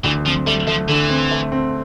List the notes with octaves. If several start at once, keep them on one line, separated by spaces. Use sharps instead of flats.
D2 E3
F3 C4
G3 A3
F3 A3
D3 E3
C4
A3
C4